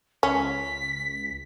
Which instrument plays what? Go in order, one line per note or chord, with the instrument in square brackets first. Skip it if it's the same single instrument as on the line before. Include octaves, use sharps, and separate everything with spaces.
[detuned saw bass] C#2 [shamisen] C#4 [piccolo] B6